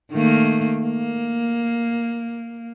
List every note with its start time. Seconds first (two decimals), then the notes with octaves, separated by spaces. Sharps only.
0.12 D#3 A3 A#3
0.81 A#3